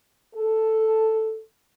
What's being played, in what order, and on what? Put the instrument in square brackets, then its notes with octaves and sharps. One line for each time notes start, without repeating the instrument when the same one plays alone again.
[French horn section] A4